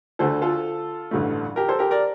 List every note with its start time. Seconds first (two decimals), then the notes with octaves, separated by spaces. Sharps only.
0.19 D2 D3 A3 A4 C5
0.42 F4 A4
1.11 A1 G2 D3 A3
1.56 G4 A#4
1.69 A4 C5
1.79 G4 A#4
1.91 A#4 D5